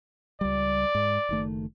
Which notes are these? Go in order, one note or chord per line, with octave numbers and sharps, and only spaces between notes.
C#2 G3 D5
G#2
F#1 D#3 A3